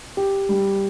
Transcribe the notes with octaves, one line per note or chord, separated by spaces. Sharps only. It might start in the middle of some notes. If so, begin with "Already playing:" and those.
G4
G3